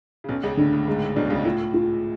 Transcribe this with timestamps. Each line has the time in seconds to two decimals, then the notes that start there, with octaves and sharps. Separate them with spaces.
0.24 C#3
0.29 B1 B2 C#4
0.43 C#2 C#3
0.57 A2 D3
0.72 A2
0.87 G#2 G#3
1.02 A2
1.16 B1 B2 D4
1.30 C#2 C#3
1.45 A2 F4
1.74 F4